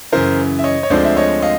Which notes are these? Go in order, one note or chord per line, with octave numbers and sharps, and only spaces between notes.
F#2 C#3 E3 A#4 C5
E5
C#5 D#5
C#5
D2 D3 F3 G#3 C4 C5 D5
E5
C#5 D#5
D#5 F5